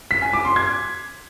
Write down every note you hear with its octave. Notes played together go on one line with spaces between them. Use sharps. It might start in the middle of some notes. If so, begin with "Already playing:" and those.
B6
G#5
D6
C6
G#6